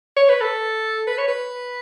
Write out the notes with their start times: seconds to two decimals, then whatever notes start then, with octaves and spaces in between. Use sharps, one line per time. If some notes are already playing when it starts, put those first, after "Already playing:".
0.16 C#5
0.29 B4
0.41 A4
1.07 B4
1.18 C#5
1.28 B4